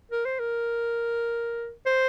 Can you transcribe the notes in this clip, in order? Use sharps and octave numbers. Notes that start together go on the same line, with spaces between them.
A#4
C5
A#4
C5